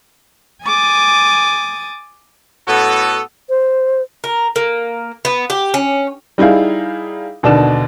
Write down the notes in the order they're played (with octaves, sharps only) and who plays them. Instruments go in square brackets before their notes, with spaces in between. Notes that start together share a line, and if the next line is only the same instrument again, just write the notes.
[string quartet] G#5 D6 D#6 A6
[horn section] A2 B3 F#4 A4
[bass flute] C5
[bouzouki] A#4
A#3
B3
G4
C#4
[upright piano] G3 D#4 E4 G#4 F5
D#2 B2 D3 D4 E7